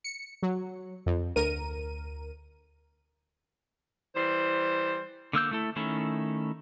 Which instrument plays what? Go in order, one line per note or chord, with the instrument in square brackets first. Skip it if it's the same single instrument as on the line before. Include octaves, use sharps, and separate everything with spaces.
[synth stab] C#7
F#3
F2
D2 A#4 D#7
[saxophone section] E3 G3 C5
[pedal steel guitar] D3 A#3 E6 G6
A3 E4 A4
D#3 A3 C#4 E4